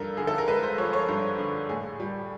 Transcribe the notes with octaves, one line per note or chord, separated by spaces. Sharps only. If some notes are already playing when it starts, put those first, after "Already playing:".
Already playing: G2 F3 A4 A#4
D3 G#4
A4
A#4
G#3 B4
C5
F3 C#5
C#5
G2 C5
D3
A2 G#4
G3